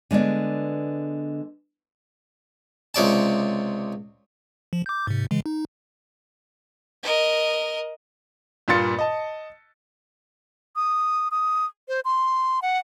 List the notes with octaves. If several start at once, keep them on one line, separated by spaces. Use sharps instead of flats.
D3 G#3 B3 D5
C#2 C3 D5 A5
F3
D6 G6
G#2 C3
C#3 E3 G#3
D#4
A#4 D#5
G2 A#2 F4 C6 A6 C#7
D#5 A5
D#6
D#6
C5
C6
F#5